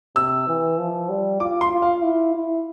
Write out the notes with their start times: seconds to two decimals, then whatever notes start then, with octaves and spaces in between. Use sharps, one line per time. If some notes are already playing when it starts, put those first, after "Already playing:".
0.16 C3 E6
0.47 E3
0.78 F3
1.09 G3
1.40 F4 D6
1.61 C6
1.71 F4
1.82 F5
2.02 E4
2.34 E4